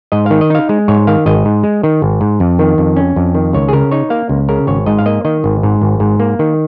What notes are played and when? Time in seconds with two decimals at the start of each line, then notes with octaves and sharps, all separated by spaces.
0.12 G#2 D#5
0.26 D#3 F5
0.41 D#5
0.50 D#4 F5
0.69 G#3
0.88 G#2 C#5
1.07 D#3 F5
1.26 G#1 D#5
1.45 G#2
1.63 G#3
1.83 D#3
2.02 G#1
2.21 G#2
2.40 F2
2.59 D#3
2.78 F2
2.96 C#4
3.16 F2
3.35 D#3
3.53 C#2 C#5
3.69 G#4
3.73 C#3 A#4
3.91 D#4 C#5
4.10 A#3 F5
4.29 C#2
4.49 C#3 A#4
4.67 G#1 C#5
4.86 G#2 D#5
4.99 F5
5.06 A#3 D#5
5.25 D#3 D#5
5.44 G#1
5.63 G#2
5.82 G#1
6.00 G#2
6.20 A#3
6.39 D#3